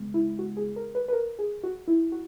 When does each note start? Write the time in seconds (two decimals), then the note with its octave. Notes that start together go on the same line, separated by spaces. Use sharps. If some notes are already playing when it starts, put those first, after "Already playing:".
Already playing: C#3 G#3 B3
0.14 E4
0.39 F#4
0.57 G#4
0.76 A#4
0.95 B4
1.08 B4
1.13 A#4
1.39 G#4
1.64 F#4
1.88 E4
2.12 F#4